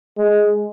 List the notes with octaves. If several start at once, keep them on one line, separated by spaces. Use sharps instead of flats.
G#3